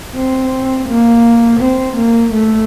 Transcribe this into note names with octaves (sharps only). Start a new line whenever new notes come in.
C4
A#3
C4
A#3
A3